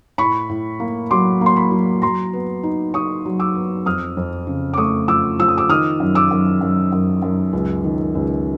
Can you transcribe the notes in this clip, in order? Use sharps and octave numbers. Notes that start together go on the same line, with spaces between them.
A2 B5 C#6
A2
A#3
F#3 C6 D6
A#3
C6
B5 C#6
F#3
F#3 A#5 C6
B3
D#4
D#4 C#6 D#6
F#3
D6 E6
B3
F2 D#6 F6
F2
C#3
D6
A3 C#6 D#6
F3 D6 E6
F3 E6
D#6
D6 E6
D#3 D#6 F6
F#2
D6 E6
F#2
F#2
F#2
F#2
C#2
D#3
C#2